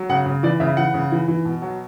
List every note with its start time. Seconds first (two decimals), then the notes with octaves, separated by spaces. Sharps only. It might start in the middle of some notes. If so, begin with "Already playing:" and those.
Already playing: F#3
0.09 C#3 F#5
0.26 C#3
0.43 E3 D5
0.60 C#3 E5
0.77 E3 F#5
0.94 C#3
1.12 E3
1.28 E3
1.45 B2
1.62 F#3